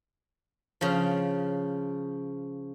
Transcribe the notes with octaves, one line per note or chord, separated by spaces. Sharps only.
C#3 F3